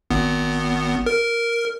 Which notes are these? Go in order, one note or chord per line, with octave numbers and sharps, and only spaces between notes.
G#1 B3
A#4